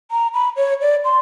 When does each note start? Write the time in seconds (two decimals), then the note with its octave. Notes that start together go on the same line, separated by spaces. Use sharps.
0.11 A#5
0.34 B5
0.56 C#5
0.81 D5
1.04 C6